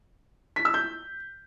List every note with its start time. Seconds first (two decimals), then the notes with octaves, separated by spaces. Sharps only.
0.56 B6
0.65 E6
0.74 G6